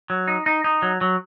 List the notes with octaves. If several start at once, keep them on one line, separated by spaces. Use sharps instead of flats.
F#3
D#4
D#4
D#4
F#3
F#3